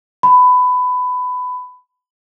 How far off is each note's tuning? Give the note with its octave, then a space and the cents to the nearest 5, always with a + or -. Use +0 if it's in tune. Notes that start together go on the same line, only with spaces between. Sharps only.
B5 +20